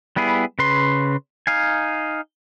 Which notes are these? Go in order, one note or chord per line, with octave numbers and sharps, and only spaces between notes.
G3 B3 E4 G#4
C#3 B4 C6
D#4 F5 G#5